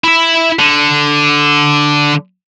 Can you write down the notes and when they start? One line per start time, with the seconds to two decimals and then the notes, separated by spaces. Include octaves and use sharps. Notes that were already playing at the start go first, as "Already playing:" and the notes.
0.04 E4 E5
0.59 D3